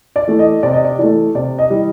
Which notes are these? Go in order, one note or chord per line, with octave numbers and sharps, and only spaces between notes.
D5
E3 A3
D#5
C3 D5
D#5
D5
E3 A3 D5
C3 D5
D#5
E3 G3